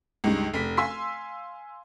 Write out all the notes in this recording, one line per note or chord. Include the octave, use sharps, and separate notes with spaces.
C#2 G2 D#4
F1 B6
F5 G#5 C6 E6 B6